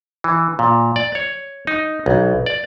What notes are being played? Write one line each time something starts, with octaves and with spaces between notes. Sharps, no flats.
E3
A#2
D5
C#5
D#4
B1
D5